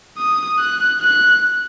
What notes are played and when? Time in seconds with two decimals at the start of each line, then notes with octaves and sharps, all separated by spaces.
0.18 D#6
0.59 F#6
1.01 F#6